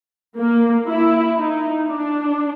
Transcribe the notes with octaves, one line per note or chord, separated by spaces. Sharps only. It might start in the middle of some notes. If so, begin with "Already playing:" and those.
A#3
E4
D#4
D4